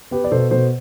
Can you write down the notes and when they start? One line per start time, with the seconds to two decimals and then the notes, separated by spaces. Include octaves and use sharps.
0.11 B3 G4 B4
0.24 D5
0.32 B2 A4 C5
0.51 B2 A4 C5